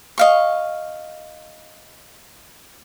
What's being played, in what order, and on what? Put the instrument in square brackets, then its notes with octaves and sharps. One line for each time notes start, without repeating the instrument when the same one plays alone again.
[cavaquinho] D#5 F5 C#6